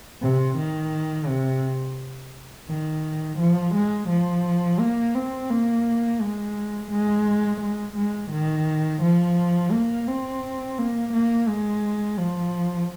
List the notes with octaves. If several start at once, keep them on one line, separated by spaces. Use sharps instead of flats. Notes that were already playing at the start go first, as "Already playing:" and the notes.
C3
D#3
C3
D#3
F3
G#3
F3
A#3
C4
A#3
G#3
G#3
G#3
G#3
D#3
F3
A#3
C4
A#3
A#3
G#3
F3